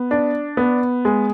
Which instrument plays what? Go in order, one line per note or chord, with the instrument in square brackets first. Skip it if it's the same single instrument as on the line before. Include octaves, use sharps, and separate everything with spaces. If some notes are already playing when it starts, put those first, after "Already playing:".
Already playing: [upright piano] B3
D4
B3
G#3